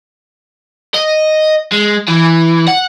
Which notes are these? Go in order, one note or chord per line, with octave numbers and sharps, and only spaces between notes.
D#5
G#3
E3
F#5